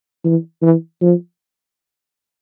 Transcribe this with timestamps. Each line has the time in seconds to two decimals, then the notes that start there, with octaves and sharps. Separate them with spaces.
0.25 E3
0.62 E3
1.01 F3